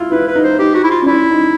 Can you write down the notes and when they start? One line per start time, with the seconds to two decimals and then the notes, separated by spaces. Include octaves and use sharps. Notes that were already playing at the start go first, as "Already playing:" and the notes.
Already playing: E4 F4
0.12 E4 B4
0.27 B4
0.35 D#4
0.44 C5
0.59 D#4 G4
0.75 F#4
0.84 E4
0.91 F4
1.02 C#4
1.06 D4 E4
1.31 D#4